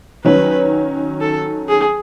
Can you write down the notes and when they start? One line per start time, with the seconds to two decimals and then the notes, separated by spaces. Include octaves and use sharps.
0.25 D#3 F#3 C#4 B4
1.21 A4
1.68 G#4